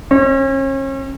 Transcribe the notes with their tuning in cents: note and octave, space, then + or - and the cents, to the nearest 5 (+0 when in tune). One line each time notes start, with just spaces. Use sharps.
C#4 -40